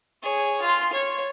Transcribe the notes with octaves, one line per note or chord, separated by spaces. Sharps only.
G#4 C#5
F4 C6
C#5